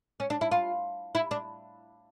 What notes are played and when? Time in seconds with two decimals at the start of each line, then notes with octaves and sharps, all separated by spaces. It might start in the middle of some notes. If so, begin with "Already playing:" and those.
0.20 C#4
0.30 D4
0.41 E4
0.51 F4
1.15 E4
1.31 D4